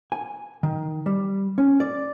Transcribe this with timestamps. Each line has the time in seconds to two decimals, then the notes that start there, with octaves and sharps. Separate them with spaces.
0.12 G#5
0.63 D#3
1.06 G3
1.58 C#4
1.80 D5